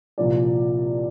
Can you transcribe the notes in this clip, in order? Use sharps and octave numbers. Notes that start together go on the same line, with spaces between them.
C2 A#2 F3 D5